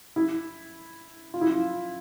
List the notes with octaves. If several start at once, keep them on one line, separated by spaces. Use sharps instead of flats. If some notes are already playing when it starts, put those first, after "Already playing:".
E4
F4
E4
F4